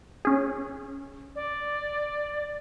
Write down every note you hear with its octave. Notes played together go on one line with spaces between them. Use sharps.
C#4 G#4
D5